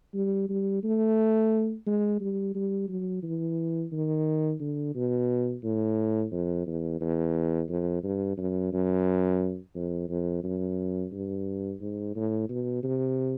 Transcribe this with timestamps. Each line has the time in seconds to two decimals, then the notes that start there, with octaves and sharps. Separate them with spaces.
0.14 G3
0.49 G3
0.83 A3
1.87 G#3
2.21 G3
2.55 G3
2.89 F#3
3.23 E3
3.92 D#3
4.60 D3
4.95 B2
5.64 A2
6.31 F2
6.67 E2
7.01 E2
7.69 F2
8.03 G2
8.37 F#2
8.73 F#2
9.75 F2
10.09 F2
10.44 F#2
11.12 G2
11.80 G#2
12.15 A2
12.49 B2
12.83 C3